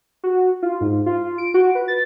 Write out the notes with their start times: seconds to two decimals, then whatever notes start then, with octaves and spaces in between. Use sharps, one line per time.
0.24 F#4
0.63 F4
0.81 G#2
1.06 F4
1.38 D7
1.54 F#4
1.75 B4
1.88 A6